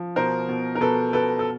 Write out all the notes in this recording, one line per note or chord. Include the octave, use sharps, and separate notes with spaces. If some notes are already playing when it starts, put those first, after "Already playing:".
Already playing: F3
B2 A#4 C5
B2
A#4
B2 A4 B4
B2 A4 B4
A4